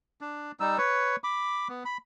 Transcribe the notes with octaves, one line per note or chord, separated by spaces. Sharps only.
D4
G3 D#4 E6
B4 C#5
B5 D6
B3
B5